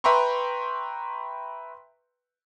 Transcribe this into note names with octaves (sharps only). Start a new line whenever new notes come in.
B4 E5 G5 A#5 C6 C#6